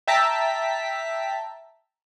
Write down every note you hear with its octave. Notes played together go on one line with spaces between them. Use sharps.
E5 G5 A5 A#5 B6